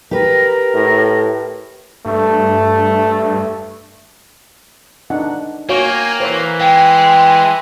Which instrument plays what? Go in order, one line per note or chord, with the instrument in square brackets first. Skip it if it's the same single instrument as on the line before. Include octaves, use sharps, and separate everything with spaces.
[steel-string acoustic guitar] G4 B4 [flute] A#4
[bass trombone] A2
[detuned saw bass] G2 [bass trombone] A3
[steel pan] D4 D#4 F#5
[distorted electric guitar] A#3 [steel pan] F#4 C#5 F5 [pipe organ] G5 G#5
[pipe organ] E3 [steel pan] C5 C#5 F5
[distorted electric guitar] G#3 [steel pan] F5 [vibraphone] G5